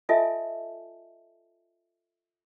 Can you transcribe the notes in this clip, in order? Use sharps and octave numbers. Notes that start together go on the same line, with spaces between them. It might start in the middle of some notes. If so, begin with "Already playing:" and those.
F4 A4 D#5 E5 G#5 A5